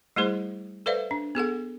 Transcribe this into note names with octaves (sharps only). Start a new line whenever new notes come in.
G3 A3 E4 G#4 C5 C6
A4 B4 C5 D5 E5 F5
D4
B3 G#4 A4 F#5